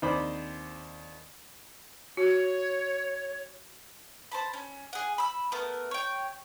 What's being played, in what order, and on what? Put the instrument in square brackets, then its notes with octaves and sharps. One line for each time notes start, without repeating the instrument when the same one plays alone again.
[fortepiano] D#2 C4 D4 C5 B5 D6
[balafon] F#4 [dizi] C#5
[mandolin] C5 A5 B5
C#4
G#4 F#5
B5 E6
A3 B3 A#4
C#5 G5